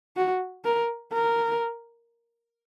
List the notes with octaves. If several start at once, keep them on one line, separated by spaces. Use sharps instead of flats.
F#4
A#4
A#4